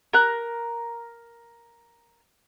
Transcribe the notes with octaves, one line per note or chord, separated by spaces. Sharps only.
A#4 F#6